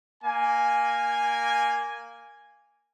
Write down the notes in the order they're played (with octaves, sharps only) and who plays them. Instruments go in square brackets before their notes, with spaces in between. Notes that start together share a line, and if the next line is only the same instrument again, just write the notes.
[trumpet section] A#3 G#5